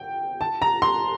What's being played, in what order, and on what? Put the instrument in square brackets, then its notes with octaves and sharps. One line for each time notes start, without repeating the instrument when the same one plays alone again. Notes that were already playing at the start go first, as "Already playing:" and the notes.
Already playing: [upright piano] G5
A5
A#5
C6